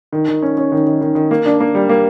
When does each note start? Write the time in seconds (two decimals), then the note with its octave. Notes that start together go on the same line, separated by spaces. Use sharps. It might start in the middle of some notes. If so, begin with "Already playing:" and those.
0.12 D#3
0.28 D#3
0.42 C#4
0.58 C#4
0.72 D#3
0.87 D#3
1.01 D#3
1.15 D#3
1.31 A#3
1.46 D4
1.60 A#3
1.75 G3
1.89 A#3